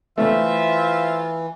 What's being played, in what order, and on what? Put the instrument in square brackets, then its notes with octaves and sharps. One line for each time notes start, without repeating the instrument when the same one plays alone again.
[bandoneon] E3 [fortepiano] A3 [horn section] F4 [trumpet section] C5 E5